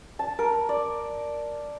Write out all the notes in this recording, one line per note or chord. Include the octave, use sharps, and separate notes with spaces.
A5
A#4
D5